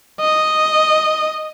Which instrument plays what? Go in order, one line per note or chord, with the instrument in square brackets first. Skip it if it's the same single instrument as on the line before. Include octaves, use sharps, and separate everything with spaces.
[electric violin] D#5